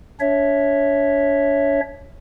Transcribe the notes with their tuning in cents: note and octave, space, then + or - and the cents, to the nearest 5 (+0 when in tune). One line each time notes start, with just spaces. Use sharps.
D4 -40 C#5 +0 E5 +0